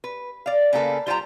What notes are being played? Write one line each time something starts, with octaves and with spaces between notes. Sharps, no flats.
B4
D5 F5
C#3 A#3 A4 B4
G3 F4 C5 G5 A#5